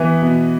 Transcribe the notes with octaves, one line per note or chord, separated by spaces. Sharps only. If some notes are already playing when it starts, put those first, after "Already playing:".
Already playing: E3 B3
B2